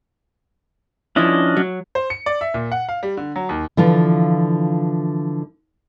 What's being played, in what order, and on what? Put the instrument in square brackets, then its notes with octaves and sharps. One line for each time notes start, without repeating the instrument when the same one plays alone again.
[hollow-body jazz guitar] F3 E4 [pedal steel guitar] C#4 D4 D#5
[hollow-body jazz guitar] F#3
[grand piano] C5
C#7
D5
E5
A#2
F#5
F5
G3
D3
F#3
D#2
[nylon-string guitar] D3 E3 F3 F4